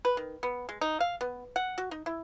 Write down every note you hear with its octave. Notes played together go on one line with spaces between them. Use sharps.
B4
D#3
B3
G#3
D#4
F5
B3
F#5
F#4
D#4
E4